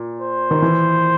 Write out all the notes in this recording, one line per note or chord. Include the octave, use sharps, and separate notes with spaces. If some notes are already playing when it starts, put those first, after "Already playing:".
Already playing: A#2
C5
D#3
E3